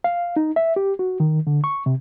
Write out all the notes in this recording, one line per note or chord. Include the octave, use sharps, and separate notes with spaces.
F5
D#4
E5
G4
F#4
D#3
D3
C#6
C3